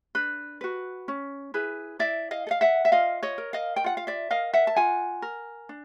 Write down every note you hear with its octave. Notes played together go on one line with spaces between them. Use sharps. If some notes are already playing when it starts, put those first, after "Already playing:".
D4 B4
F#4 B4
C#4
E4 G#4 B4
E4 D5 E5
D#5 F5
A4
F5
E5 F#5
E5
F4 D#5 F5
C#5 D#5
A#4
D#5 F5
G5
F4 F#5
F5
D5 E5
A#4 D#5 F5
E5 F#5
A5
F4 F#5 G#5
A#4
D4